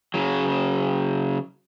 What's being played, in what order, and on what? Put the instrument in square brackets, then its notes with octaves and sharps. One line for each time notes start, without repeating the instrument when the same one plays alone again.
[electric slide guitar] C#3 F#3